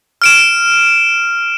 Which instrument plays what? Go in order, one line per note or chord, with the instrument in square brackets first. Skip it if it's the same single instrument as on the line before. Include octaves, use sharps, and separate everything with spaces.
[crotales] F6 D7 E7